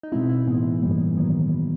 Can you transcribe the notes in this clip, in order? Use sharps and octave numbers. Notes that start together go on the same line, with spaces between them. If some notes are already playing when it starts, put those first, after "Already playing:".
D#4
B2 G#3 C4 E4
E4
A2 E3 G#3 B3
G2 E3 G3 A#3
D#3 F#3 B3